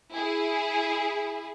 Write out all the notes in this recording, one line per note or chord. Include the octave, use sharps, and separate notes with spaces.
E4 G#4